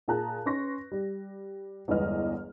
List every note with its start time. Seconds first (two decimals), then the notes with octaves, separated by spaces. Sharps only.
0.08 A#2 F4 G#4 A5 A#5 F#6
0.46 C#4 B4 C6 C#6 A#6
0.92 G3
1.88 G1 E2 G#3 B3 D#5 F6